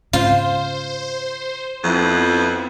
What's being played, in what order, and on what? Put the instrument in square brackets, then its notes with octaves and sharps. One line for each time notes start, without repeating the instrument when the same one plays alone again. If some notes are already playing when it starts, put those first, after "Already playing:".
[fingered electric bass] G#2 C#3 [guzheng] F4 [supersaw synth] C5
[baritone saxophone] F2 [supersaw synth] F3 B3 E4